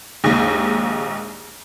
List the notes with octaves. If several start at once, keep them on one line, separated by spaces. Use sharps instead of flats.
A#1 D#2 G#2